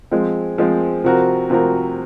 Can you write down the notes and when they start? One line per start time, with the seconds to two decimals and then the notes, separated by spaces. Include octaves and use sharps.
0.11 F3 G#3 C4
0.58 F3 G#3 C4
1.04 C3 F3 C4 F#4 A#4
1.50 C3 F3 C4 F#4 A#4